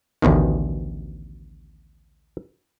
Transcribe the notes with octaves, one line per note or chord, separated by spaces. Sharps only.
A1 D2 B2 D#3